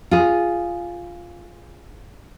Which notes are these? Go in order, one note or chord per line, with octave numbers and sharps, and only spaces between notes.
F4 G#4